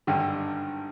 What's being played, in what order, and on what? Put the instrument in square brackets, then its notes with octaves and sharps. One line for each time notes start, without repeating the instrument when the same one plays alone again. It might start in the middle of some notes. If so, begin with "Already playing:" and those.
[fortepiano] G#1 G2 D3 [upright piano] G4